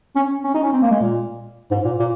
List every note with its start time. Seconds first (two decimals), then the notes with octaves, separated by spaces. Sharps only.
0.16 C#4
0.45 C#4
0.54 D#4
0.63 C#4
0.73 C4
0.82 A#3
0.91 G#3
1.01 A#2
1.71 G#2
1.85 A#2
2.00 A#2